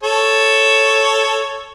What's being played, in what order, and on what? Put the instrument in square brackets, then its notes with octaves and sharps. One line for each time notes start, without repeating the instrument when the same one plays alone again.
[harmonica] A4 C#5